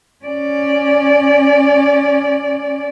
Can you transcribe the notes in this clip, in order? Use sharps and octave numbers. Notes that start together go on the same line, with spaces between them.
C#4 D5